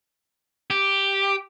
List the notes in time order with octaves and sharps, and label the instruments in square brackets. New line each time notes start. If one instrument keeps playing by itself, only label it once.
[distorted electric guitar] G4